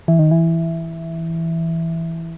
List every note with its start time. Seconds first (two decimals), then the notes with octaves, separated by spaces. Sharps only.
0.08 E3
0.19 D#3
0.31 E3